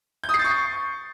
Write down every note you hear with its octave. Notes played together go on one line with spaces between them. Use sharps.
G6
D#6
C7
A6
C#6